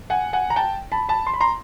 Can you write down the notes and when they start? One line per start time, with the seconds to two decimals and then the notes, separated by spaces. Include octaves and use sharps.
0.10 F#5 G#5
0.33 F#5 G#5
0.50 A#5
0.56 G5 A5
0.92 A5 B5
1.09 A5 B5
1.27 C6
1.34 B5
1.41 A#5 C6